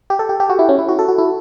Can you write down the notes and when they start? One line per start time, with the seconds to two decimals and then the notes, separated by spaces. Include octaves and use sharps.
0.10 G4
0.19 A4
0.29 G4
0.40 G4
0.49 F#4
0.59 E4
0.69 C#4
0.79 E4
0.89 F#4
0.99 A4
1.08 F#4
1.18 E4